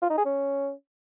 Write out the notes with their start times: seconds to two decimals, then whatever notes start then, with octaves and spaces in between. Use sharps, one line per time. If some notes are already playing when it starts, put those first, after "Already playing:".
0.02 F4
0.10 D#4
0.18 G#4
0.25 C#4